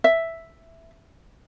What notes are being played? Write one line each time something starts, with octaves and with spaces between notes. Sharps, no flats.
E5